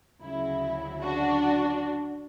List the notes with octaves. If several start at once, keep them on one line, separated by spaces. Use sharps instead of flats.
D2 C#3 F#3 E4
D4 F#4